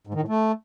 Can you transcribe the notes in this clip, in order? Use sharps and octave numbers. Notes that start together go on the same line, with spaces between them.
G#2
D#3
A2
A3